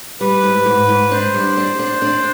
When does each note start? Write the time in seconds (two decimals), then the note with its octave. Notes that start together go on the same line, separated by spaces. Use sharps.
0.21 G3 B4
0.43 G#2
0.66 G#2
0.89 G#2
1.11 D4 C5
1.34 G3
1.57 D4
1.79 D4
2.02 D4